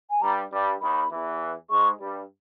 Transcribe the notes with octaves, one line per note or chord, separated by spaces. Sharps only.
G#5
G2 G3 A#5
G2 G3
D#2 D#3 B5
E2 E3
G#2 G#3 C#6
G2 G3